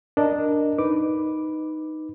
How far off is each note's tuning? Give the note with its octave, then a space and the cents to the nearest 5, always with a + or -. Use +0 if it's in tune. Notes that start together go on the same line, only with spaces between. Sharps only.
D4 +0 A#4 +0 D#5 -10
D#4 +0 B4 +0 D6 +0